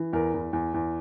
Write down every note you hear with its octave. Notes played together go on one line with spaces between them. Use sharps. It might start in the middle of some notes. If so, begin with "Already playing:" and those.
Already playing: E3
E2 A#4
E2
E2
E2